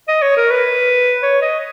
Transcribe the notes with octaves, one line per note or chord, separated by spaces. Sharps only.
D#5
C#5
A#4
B4
C#5
D#5